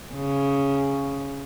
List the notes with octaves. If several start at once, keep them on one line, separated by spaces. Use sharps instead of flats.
C#3